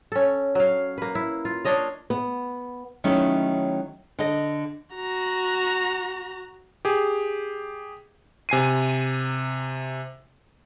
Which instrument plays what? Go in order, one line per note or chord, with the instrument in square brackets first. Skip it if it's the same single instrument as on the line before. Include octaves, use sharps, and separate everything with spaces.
[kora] C#4 A4
F#3 F5
A#3 B4
E4
F4
D4 C#5 D#5 F5
[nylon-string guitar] B3
D#3 F#3 A3 C#4 D#4 E4
D3 D#5
[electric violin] F#4 A#5
[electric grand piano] G4 G#4
C3 G#5 C7 D#7